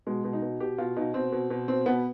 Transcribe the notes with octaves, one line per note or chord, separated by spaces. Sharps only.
B2 G#3
B2
D#4
B2
B2 G4
B2 F4
B2 D#4
B2 C4
B2
B2
B2 C4
B2 B3